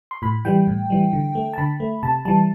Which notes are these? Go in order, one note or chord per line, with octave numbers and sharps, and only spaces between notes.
C6
A2 B5
E3 G3 G5
A2
E3 G3
D3
A3
A5
D3 B5
A3
C3 A5
E3 G3 A5